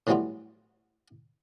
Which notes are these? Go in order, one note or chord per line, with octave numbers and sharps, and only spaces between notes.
A2 E3 F#3 G3 B3 F4